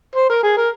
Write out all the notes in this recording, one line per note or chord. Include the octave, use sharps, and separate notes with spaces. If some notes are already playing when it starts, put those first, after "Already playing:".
C5
A#4
G#4
A#4